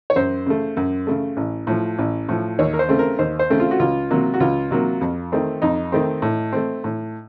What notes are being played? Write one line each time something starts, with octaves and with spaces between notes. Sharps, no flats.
C#5
F#2 C5
C#3 A3
F#2
C#3 A3
A1
A2 F3
A1
A2 F3
D#2 C#5
A#4
C5
C#3 A3 C4
A#4
D#2 C5
C5
C#3 A3 C4
F4
F#4
C#2 F4
C3 F#3 A#3
F#4
C#2 F4
C3 F#3 A#3
F2
D#3 A3 C4
F2 D#4
D#3 A3 C4
A2
A3 C4
A2